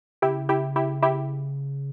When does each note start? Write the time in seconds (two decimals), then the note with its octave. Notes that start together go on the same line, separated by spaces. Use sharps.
0.22 C#3 E4 G4
0.49 E4 G4
0.76 E4 G4
1.03 E4 G4